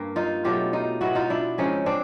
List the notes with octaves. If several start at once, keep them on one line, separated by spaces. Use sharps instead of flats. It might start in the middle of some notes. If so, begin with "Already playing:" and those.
Already playing: G2 A#3
D#4 F4
B2 F#3 A3 F4 G4
D#4 F4
B2 G#3 B3 E4 F#4
D#4 F4
D4 E4
C#3 F3 G#3 C4 C#4 D#4
C4 D4